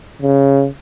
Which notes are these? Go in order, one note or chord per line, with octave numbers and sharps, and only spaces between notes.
C#3